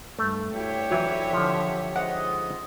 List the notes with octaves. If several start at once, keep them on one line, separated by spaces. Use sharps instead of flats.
G2 A3
D2 E4 G4 C#5 E5 G5
E3 F#3
D3 F3
G#2 F4 D#5 F#5